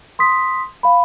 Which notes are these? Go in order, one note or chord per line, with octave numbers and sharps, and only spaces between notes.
C6 D#6 B6
F5 B5